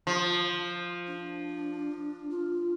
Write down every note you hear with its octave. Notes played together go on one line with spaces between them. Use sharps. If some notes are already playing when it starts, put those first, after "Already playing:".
F3
D4
F4